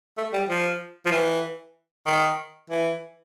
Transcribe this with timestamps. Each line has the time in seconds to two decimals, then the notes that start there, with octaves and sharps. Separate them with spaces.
0.18 A3
0.33 G3
0.49 F3
1.06 F3
1.12 E3
2.06 D#3
2.70 E3